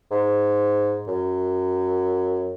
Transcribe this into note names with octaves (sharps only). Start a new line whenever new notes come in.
G#2
F#2